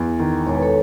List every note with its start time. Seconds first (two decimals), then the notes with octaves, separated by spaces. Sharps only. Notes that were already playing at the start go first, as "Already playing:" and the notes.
Already playing: E2
0.19 D#3
0.46 E1 C#5
0.55 B4
0.62 A4 C#5